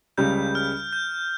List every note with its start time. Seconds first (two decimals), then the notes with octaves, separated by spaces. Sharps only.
0.18 C#2 C#3 G3 G6
0.55 F6
0.93 G6